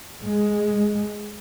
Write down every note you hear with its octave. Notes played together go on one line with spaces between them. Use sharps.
G#3